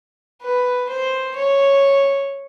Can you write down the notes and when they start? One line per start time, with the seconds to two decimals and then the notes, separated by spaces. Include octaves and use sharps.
0.42 B4
0.90 C5
1.36 C#5